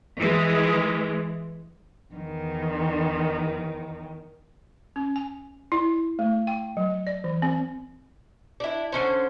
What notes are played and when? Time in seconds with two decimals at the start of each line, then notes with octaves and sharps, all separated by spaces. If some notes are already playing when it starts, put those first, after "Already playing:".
0.18 E3 G#3
2.14 E2 D#3
4.96 C#4
5.16 G#5
5.72 E4
6.19 A3
6.47 G5
6.77 F#3
7.07 D5
7.24 E3
7.42 C4
8.60 D4 E4
8.92 D3 C#4 C5